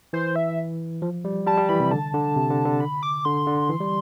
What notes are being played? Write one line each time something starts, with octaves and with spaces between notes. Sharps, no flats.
E3 C5
E5
F3
G3
G3 A5
G3
E3 B5
C3
D3 A5
D3
C3
D3
D3
B5
D6
D3 C6
D3
E3
G3